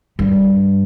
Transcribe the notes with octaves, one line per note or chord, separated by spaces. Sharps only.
G2